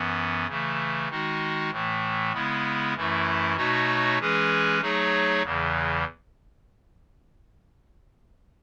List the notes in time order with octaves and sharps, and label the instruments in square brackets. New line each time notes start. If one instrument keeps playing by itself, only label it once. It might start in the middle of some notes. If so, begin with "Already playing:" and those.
Already playing: [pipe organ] F#2 E3 B3
C#3 E3 A3
D#3 G#3 D#4 F#4
A2 E3 A3
C#3 G#3 B3 E4
F#2 E3 A3 E4
B2 A3 D#4 F#4 C#5
E3 G#3 C#4 G#4 B4
F#3 A3 D#4 G#4 C#5
E2 C#3 E3